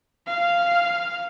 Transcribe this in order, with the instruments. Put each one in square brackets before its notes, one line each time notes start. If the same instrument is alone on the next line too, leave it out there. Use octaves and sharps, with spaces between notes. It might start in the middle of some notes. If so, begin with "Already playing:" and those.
[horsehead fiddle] F5